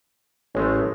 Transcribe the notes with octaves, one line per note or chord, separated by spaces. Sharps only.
A1 G#3 A3 C#4